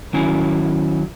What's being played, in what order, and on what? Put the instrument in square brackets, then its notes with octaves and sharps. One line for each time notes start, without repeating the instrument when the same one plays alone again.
[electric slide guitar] D#3 F#3 C#4 E4